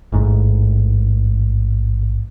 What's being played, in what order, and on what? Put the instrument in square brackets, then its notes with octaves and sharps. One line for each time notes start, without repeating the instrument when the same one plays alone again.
[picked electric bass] A1 G#2